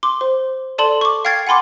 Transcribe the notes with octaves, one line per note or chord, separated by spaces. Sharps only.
C6 D6
C5
A4 D5 A5 C6 F#7
C#6 D6
F5 G5 F6 G#6 A6 C7
F#5 G#5 B5 C6 D6